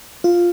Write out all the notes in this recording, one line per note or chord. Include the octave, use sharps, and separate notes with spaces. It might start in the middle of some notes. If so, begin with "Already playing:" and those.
F4